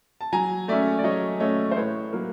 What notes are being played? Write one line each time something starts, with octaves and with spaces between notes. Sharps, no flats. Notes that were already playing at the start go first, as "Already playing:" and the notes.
A5
F#3 G#5 A#5
A3 C#4 D5 E5
D5
F#3 C#5 D#5
A3 C#4 C#5 D#5
C5
A2 B4 C#5
F#3 A#3